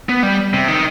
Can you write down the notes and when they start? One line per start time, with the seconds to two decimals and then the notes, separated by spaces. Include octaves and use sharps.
0.09 B3
0.23 G3
0.54 C3
0.68 D#3